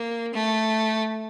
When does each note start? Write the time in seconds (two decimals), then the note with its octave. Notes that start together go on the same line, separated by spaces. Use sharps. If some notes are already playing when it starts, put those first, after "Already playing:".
Already playing: A#3
0.34 A3